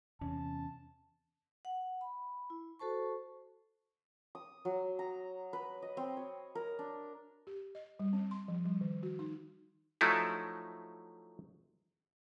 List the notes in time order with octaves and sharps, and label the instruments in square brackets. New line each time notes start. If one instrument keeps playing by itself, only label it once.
[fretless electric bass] E2 C3 [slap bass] C#4 [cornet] A5
[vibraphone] F#5
B5
E4
F#4 A4 C5 A5 C#6
[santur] D#6
F#3
A#5
B4
D#5
C4
C#5
A#4
D4
[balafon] G4
D#5
G3
C4
C6
F3
G3
D#3
F#4
D#4
[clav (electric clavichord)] F3 F#3 A3 D#4 E4